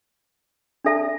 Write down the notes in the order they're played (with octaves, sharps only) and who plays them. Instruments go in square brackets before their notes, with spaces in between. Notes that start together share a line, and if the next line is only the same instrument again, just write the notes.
[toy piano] D4 A4 E5 A5